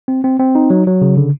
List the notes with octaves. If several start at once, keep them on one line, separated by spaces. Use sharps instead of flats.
C4
C4
C4
D#4
F#3
F#3
C#3
D3